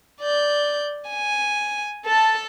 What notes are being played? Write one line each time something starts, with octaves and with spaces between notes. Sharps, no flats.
D5 G6
G#5
A4 A5